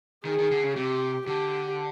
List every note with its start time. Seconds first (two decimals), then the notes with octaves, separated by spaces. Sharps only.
0.25 D#3 G#4
0.39 D#3
0.51 D3
0.63 C#3
0.76 C3 G4
1.27 D3 G4